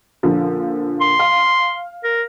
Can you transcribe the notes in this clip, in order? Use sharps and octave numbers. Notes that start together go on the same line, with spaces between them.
A#2 D3 F3
C6
F5
A#4